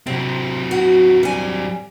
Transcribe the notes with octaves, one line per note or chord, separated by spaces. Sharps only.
C3 F#3 C4
F#4
G3 G#5